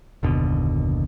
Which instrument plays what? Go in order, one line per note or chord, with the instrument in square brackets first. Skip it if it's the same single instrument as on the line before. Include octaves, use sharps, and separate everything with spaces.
[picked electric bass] F#1 D#2 B2 D3